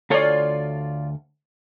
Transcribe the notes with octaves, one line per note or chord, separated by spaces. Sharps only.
D2 F4 A4 C#5 D5